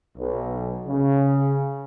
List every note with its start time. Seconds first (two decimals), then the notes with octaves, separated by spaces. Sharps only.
0.17 B1
0.87 C#3